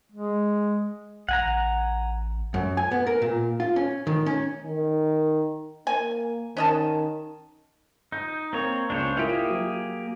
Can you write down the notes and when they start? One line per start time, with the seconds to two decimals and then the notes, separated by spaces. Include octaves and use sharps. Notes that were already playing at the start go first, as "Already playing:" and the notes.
0.12 G#3
1.29 A1 F#5 G#5 A#5
2.54 F#2
2.77 G#5
2.91 B3
3.07 A#4
3.22 A#2
3.60 F4
3.76 C#4
4.07 D#3
4.26 C#4
4.65 D#3
5.87 A#3 G#5
6.57 D#3 C#4 D#5 A5
8.12 D#4 G6
8.53 A#3 C4 C#5 A#5 G#6
8.90 C#2 C#3 D4 C5 C#5
9.17 A#3 E4 F4 G4 G#4 A#4
9.50 F#3